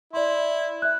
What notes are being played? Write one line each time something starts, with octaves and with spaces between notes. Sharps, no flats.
E4 D5 C6
E5 F#6